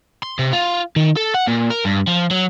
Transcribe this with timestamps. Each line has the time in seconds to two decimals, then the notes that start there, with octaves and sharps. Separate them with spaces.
0.23 C6
0.39 C3
0.53 F4
0.96 D#3
1.17 A4
1.35 F#5
1.48 A#2
1.70 A#4
1.85 G2
2.07 F3
2.31 F#3